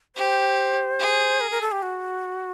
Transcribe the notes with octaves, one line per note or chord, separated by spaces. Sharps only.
G4 C5
G#4
A#4
A#4
A4
G4
F#4